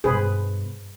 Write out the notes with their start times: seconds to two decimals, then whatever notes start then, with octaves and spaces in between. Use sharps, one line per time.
0.04 G2 B2 G#4 B4 C5